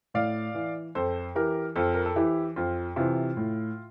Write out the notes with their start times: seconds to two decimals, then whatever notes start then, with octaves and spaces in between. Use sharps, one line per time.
0.14 A2 D5 F5
0.55 E3
0.95 F2 A4 C5
1.35 E3 G4 A#4
1.75 F2 F4 A4
1.94 A#4
2.05 A4
2.16 E3 E4 G4
2.56 F2 F4
2.96 C3 E3 F4
3.37 A2